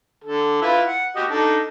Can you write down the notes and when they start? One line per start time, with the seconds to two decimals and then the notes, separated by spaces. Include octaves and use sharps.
0.24 D3 A4
0.62 E4 F4 B4
0.86 F#5
1.16 F#4 G4 D#5
1.30 D4 D#4 A4